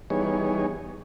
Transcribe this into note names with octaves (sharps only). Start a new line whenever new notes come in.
E3 G3 B3 D#4 G#4 C#5